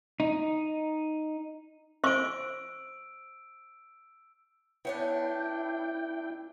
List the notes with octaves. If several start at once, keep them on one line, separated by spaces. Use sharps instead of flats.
D#4
C5 C#6 E6 D7
B3 C#4 D4 E4 G5